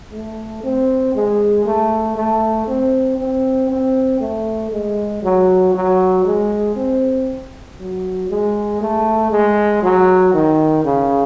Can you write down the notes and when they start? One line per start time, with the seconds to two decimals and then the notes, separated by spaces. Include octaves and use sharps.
0.11 A3
0.63 C4
1.14 G#3
1.66 A3
2.16 A3
2.67 C4
3.18 C4
3.69 C4
4.20 A3
4.71 G#3
5.23 F#3
5.74 F#3
6.25 G#3
6.76 C4
7.78 F#3
8.30 G#3
8.81 A3
9.31 G#3
9.82 F#3
10.34 D#3
10.84 C#3